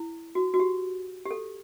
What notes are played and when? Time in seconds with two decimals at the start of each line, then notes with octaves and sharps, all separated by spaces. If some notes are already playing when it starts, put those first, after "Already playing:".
Already playing: E4
0.35 F#4
0.54 F#4
0.60 G4
1.25 G4
1.31 A4